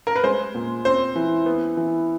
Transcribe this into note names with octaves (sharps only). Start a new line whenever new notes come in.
A#4
B4
G#3 C5
A#2
C4 C5
E3
B3
E3